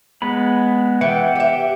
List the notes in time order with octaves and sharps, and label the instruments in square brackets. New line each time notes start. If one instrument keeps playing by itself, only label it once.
[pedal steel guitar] G#3 B3 B5
[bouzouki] E3 [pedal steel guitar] F#5 G5
[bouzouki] G4 E5